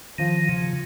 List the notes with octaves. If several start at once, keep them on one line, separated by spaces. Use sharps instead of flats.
D#3 F3
C#3 F4